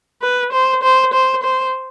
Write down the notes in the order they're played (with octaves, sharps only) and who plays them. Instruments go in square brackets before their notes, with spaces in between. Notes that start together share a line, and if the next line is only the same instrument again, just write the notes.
[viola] B4
C5
C5
C5
C5